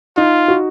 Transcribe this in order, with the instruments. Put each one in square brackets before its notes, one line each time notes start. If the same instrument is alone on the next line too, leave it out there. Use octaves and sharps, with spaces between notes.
[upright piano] D#4 [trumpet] F4
[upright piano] F#4